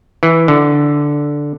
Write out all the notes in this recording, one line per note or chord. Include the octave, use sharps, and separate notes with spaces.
E3
D3